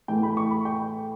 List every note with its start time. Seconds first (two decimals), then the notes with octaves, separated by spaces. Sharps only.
0.08 A2 E3 A3 G5
0.23 B5
0.37 C#6
0.51 B5
0.65 G5